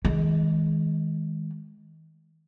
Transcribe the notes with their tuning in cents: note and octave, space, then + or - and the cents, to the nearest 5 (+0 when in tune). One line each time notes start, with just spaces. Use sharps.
D#3 +45 G#3 +0